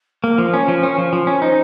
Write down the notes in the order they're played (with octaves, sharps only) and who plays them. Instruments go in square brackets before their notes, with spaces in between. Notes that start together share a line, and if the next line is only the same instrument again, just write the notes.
[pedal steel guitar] A#3 [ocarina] A#4
[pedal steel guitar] F3
C#4
F3
C#4
F3
F3
C#4
[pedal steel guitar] D#4 [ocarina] C5